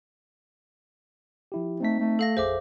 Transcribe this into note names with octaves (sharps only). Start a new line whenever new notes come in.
F3 E4 G4
A3 C4 D#4 B6
A3
A4 F5 A#6
A1 F2 G#4 C5 E5 D6